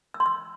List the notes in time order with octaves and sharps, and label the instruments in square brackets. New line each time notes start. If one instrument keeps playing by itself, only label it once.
[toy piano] E6
C6
E6